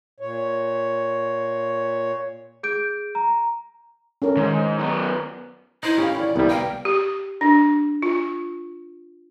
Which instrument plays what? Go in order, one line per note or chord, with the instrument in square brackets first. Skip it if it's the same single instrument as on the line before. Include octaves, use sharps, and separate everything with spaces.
[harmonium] A#2 C#5
[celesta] G#4 G6 D7
A#5
[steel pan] C#4 A4 A#4
[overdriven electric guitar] G#2 [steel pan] D#3
[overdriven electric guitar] F#2 B3
[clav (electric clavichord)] D#4 C5 [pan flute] E4
[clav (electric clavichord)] C#4 [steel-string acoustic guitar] G4 F5
[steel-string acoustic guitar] D#3 D5
[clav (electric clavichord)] C2 G3 [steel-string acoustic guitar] B3
[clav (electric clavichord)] A#3 [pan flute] G5
[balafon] G4
D4
F4